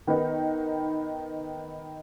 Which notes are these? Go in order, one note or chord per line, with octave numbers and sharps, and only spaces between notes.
D#3 B3 D#4